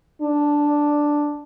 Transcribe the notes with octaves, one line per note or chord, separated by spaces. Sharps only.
D4